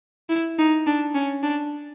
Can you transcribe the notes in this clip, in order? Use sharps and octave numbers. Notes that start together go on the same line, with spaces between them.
E4
D#4
D4
C#4
D4